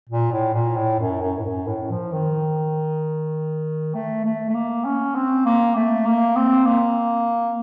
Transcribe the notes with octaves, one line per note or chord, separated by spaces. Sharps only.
A#2
A2
A#2
A2
F#2
F#2
A2
F#2
A2
F3
D#3
A3
A3
A3
A#3
C#4
C4
A#3
A3
A#3
C4
A#3